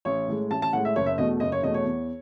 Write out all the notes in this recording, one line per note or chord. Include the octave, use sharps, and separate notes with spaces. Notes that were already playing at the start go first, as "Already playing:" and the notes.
A1 C#5
A2 G#3
A1 A5
A5
A2 G#3 F#5
E5
F#1 C#5
E5
E2 B2 A3 D#5
F#1 D#5
C#5
E2 B2 A3 D#5
C#5
E2